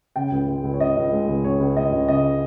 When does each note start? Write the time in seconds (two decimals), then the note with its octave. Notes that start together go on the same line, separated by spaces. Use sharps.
0.16 C#3 G5
0.32 C#2
0.48 G#3
0.64 C#2
0.74 C#5
0.80 C#3 D#5
0.96 C#2
1.12 G#3
1.28 C#2
1.44 C#3 C#5
1.60 C#2
1.76 G#3 D#5
1.92 C#2
2.08 C#3 D#5